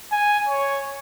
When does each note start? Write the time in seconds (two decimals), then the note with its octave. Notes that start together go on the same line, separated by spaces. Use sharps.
0.12 G#5
0.49 C#5